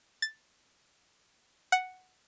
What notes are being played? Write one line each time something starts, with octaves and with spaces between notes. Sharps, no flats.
A6
F#5